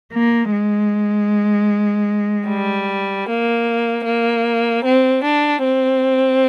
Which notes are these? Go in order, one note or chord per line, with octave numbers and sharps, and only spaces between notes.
A#3
G#3
G3
A#3
A#3
C4
D4
C4